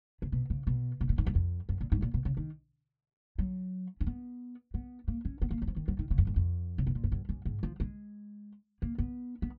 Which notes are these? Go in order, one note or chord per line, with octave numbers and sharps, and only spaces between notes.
C#3
B2
C#3
B2
B2
A#2
G#2
F#2
F2
F#2
A#2
G#2
A#2
B2
C#3
D#3
F#3
C#4
B3
B3
A#3
C#4
B3
A#3
F#3
F3
D#3
F#3
D#3
C#3
F#2
G#2
F2
C#3
B2
A#2
G#2
F#2
F#2
G#2
F3
G#3
A#3
B3
B3